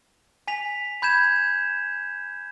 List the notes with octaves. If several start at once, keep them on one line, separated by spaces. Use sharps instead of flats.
G#5 B6 F7
B5 G6 G#6 E7